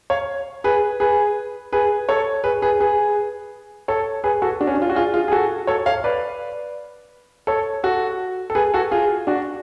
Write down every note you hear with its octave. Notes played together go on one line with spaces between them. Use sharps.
C#5 F5
G#4 B4
G#4 B4
G#4 B4
A4 C#5
G#4 B4
G#4 B4
G#4 B4
A4 C#5
G#4 B4
F#4 A4
D4 F#4
C#4
D4
F4
F#4
F4 G#4
F4 G#4
G#4
F#4 A4
A4 C#5
C#5 F5
B4 D5
A4 C#5
F#4 A4
A4
G#4 B4
F#4 A4
F4 G#4
D4 F#4